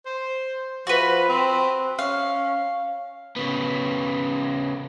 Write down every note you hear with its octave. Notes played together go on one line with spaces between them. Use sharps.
C5
F3 F#4 B4
C4
C#4 F5
C#3 B3